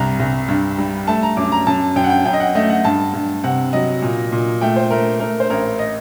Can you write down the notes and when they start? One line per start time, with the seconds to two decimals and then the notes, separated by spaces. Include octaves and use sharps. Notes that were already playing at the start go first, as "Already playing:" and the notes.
Already playing: C2 G2 A#5
0.20 C2
0.48 G2
0.78 G3
1.07 A3 A5
1.23 A#5
1.37 F#2 D6
1.52 A#5
1.67 F#2 A5
1.96 F#2 G5
2.04 F#5
2.10 G5
2.25 F#2 G5
2.33 D#5
2.40 F#5
2.55 A3 D#5
2.70 F#5
2.85 G2 A5
3.14 G2
3.44 C3 F#5
3.73 F#3 D#5
4.02 A#2
4.32 A#2
4.61 A3 G5
4.76 C5
4.90 A3 A#4
5.20 A3 A#4
5.40 C5
5.50 A1 A#4
5.79 D#5